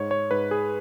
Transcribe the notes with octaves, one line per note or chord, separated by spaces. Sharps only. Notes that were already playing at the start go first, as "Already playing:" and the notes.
Already playing: G#2 C#5
C#5
G#2 B4
G#4